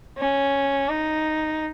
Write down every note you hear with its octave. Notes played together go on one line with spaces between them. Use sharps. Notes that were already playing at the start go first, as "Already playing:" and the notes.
C#4
D#4